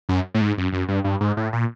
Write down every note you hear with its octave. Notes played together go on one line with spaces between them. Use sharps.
F#2
A2
G#2
F#2
F#2
G2
G2
G#2
A2
A#2